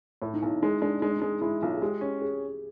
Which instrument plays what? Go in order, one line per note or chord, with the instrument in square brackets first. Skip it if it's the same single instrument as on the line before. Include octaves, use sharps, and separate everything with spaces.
[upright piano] A2 [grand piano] E4
[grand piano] D#4
[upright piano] B1 [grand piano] E4
[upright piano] G#3 [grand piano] D#4
[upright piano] G#3 [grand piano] D4
[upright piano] G#3 [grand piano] D#4
[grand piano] D4
D#4
[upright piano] G#3
[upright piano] G#3 [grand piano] E4
[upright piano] B1 [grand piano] F4
[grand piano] G#4
[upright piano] G#3 [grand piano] G4
[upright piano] C#4
[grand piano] G#4